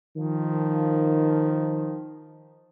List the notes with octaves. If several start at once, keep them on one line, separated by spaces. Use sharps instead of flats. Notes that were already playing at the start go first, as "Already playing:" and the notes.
D#3 F3